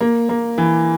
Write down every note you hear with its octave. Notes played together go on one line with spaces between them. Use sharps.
A#3
A#3
E3